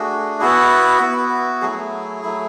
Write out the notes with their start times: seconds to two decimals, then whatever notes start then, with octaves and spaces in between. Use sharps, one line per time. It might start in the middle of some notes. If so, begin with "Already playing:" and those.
Already playing: A3 D4 F#4 G#4
0.41 B3 E4 F#4
1.01 B3 E4
1.62 F#3 A3 E4 G#4
2.23 F#3 A3 E4